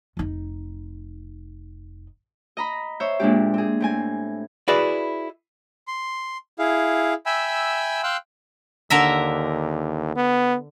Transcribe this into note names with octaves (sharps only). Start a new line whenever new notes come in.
F1 D#4
D#5 A#5 B5
C5 C#5 E5
A#2 G#3 D4 G4
C4 G#4
A2 C4 G#5
E4 F#4 G#4 B4 D5 E5
C6
E4 G#4 F5
E5 G5 G#5 B5 E6
F5 G5 C6 E6 F#6
D#2 D3 A#4 E5
B3